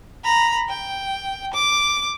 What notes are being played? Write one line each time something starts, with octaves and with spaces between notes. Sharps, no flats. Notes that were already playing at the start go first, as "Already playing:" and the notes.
A#5 B5
G5
D6